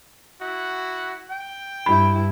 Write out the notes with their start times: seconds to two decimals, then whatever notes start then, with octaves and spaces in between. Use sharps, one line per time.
0.40 E4 F#4
1.30 G5
1.86 G2 E4 B5